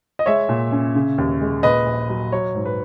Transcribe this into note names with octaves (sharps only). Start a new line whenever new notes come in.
D#5
G#3 C#5 E5
A#2
C#4
C#3
D#2
G#3
A#2 B4 D#5
A#1
F#3
F#3 C#5
G#2
B4